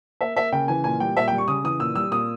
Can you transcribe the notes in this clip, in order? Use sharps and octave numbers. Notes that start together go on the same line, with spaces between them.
A#3 E5
A#3 E5
C#3 G5
E3 G#5
A#2 G#5
G3 G5
A#2 E5
G5
G3
C#6
C#3 D#6
E3 D#6
A#2 E6
G3 E6
A#2 D#6